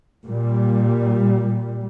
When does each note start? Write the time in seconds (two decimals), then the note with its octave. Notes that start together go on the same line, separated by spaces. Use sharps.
0.25 A#2 G3